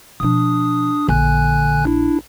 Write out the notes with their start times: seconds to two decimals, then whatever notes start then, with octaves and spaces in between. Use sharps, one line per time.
0.20 B2 F3 D4 D#6
1.08 A#1 D3 G#5 F#6
1.85 D4 E4